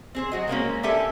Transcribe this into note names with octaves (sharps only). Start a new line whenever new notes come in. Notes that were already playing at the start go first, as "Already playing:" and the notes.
C4 G#4 C5
F#3 F#4 D#5
G#3 A#3 C4 C#4
D4 G4 A4 E5 G#5